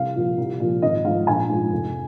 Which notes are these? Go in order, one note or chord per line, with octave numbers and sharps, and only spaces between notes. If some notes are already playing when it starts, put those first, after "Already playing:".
Already playing: C2 F5
A#2 F3
C2
A#2 F3
G#1 D#5
G#2 F3 F5
A#1 G#5
G#2 F3
F1